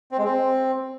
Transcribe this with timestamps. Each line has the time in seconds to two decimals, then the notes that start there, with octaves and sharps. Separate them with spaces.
0.11 C4
0.18 G#3
0.25 C4